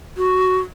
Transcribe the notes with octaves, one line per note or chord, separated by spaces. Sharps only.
F#4